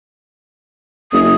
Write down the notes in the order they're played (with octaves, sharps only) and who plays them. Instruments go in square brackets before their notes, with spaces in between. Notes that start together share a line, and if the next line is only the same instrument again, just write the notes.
[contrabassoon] F#1 [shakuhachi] D#6